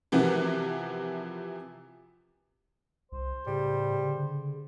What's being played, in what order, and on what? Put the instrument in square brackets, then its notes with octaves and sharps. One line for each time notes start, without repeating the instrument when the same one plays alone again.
[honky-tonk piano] C3 E3 F3 F#4 A#4 B4
[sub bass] C2 [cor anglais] C5
[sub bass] A2 [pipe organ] C#3 [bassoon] G3
[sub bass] D3